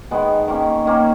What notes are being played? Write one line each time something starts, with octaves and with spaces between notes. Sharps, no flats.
D#3 G#3 B3
D#3 A#3 C#4
D#3 A#3 C#4